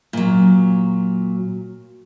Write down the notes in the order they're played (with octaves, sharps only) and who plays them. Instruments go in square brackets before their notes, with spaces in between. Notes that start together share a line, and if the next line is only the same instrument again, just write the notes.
[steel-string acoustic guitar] A#2 F#3